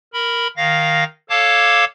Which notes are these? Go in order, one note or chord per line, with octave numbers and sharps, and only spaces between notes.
A#4 B5
D#3 F5 A#6
A4 C#5 F5 A5 D6 G#6